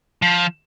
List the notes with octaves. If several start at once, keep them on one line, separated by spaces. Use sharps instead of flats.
F3